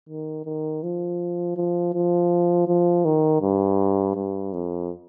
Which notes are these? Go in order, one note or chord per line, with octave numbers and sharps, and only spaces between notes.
D#3
D#3
F3
F3
F3
F3
D#3
G2
G2
F2